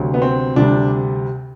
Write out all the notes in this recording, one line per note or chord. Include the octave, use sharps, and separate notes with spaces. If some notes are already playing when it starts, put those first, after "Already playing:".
Already playing: D2 C3 F#3
B3
C4
D2 C3 G3 D4